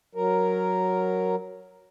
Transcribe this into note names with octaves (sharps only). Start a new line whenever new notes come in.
F#3 A#4